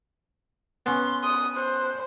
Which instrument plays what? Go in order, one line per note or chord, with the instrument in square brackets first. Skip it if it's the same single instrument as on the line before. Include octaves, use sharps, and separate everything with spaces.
[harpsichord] B3 C#4 [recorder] C6
[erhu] D#6
[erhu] C5 [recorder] F#6